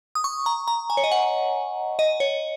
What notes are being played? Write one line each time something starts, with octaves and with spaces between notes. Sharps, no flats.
D#6
C#6
A#5
A#5
G#5
C#5
D#5
F#5
D#5
C#5